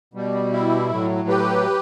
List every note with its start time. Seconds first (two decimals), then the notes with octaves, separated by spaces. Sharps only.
0.14 B2 G3
0.53 E4
0.90 A2 F#3
1.29 G4 B4